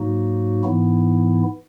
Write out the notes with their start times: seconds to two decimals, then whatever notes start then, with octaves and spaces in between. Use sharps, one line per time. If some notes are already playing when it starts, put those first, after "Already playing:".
Already playing: G#2 F#3 A#3 D#4 F#4
0.63 G#2 E3 B3 E4